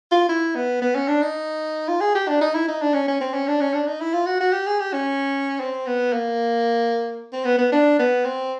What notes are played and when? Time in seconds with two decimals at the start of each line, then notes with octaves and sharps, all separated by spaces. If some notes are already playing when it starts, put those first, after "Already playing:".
0.12 F4
0.29 E4
0.55 B3
0.82 B3
0.95 C#4
1.08 D4
1.22 D#4
1.88 F4
2.01 G#4
2.15 G4
2.28 D4
2.41 D#4
2.54 E4
2.68 D#4
2.81 D4
2.94 C#4
3.08 C#4
3.21 C4
3.34 C#4
3.48 D4
3.61 C#4
3.74 D4
3.87 D#4
4.01 E4
4.14 F4
4.27 F#4
4.41 F#4
4.53 G4
4.67 G#4
4.80 G4
4.93 C#4
5.60 C4
5.87 B3
6.13 A#3
7.33 C4
7.45 B3
7.59 B3
7.72 D4
7.99 B3
8.25 C4